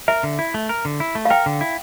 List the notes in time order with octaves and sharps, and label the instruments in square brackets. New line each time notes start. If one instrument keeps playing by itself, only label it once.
[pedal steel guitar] A#4 [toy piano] E5
[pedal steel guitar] D3
E4
A3
A#4
D3
E4
A3
[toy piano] F5
[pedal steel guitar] A#4 [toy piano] G5
[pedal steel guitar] D3
E4